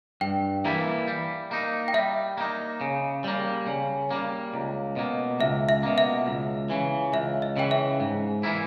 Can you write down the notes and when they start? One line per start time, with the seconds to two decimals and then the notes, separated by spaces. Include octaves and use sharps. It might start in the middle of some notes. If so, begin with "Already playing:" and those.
0.21 G2 G5
0.65 E3 G3 A#3 E4
1.07 G3
1.51 A#3 D#4
1.88 G5
1.94 G3 E5
2.38 A#3 D#4
2.81 C#3
3.24 G3 A#3
3.67 C#3
4.11 G3 A#3
4.54 C#2
4.96 B2 A#3
5.40 C#2 E5
5.69 E5
5.83 B2 A#3
5.98 E5
6.27 C#2
6.70 C#3 E3
7.13 C#2 E5
7.42 D#5
7.56 C#3 E3 G5
7.71 E5
8.00 G#2
8.43 E3 A#3 E4